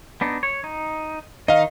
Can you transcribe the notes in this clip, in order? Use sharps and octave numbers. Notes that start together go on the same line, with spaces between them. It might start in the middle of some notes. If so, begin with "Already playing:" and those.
B3 D4 D#4
C#5
D#4
D#3 D#4 D#5 F5